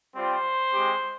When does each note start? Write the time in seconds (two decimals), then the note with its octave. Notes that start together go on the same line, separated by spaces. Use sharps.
0.15 G3 C4 F4 C5
0.72 G#3 C4 G4